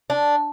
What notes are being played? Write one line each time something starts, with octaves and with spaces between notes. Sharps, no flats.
D4